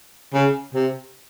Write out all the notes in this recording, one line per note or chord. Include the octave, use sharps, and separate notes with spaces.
C#3
C3